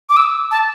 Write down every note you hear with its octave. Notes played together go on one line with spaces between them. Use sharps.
D6
E6
A5